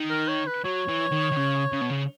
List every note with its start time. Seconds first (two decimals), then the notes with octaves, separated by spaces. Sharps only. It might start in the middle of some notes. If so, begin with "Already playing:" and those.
Already playing: D#3
0.10 A#4
0.28 C#5
0.47 B4
0.64 F#3 C#5
0.88 E3
1.12 D#3
1.32 D#3
1.37 C#3
1.72 C#3
1.81 B2
1.89 C#3